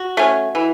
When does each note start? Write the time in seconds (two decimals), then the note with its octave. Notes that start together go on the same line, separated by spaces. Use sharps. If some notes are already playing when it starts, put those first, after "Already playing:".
Already playing: F#4
0.17 A3 C#4
0.55 E3